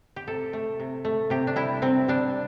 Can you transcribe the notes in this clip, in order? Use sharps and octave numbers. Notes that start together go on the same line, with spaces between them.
G4
C3 A4
A3
C3
A3
C3 G4
D4
G3 E4
C3 C4
G3 D4